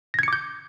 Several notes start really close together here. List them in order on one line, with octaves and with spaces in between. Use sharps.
A#6 G#6 C#7 D6 G6